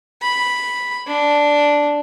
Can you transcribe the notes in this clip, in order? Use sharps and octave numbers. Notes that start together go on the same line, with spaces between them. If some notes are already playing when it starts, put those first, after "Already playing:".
B5
D4